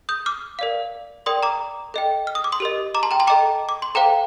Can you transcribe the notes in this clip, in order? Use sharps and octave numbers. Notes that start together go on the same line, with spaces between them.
D#6 G6
D6 F6
A#4 D5 F5
A#4 D5 G5 C6 D#6
A#5 D6
A4 D#5 G5
F6
D#6
D6
C6 D#6
G4 A#4 D#5
A#5 D6
A5 C6
G5 A#5
A5 C6
A4 D#5 G5 A#5 D6
D6
C6
A4 C5 F5 G5 A#5